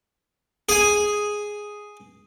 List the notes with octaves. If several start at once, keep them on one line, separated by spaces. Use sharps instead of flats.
G#4 G#5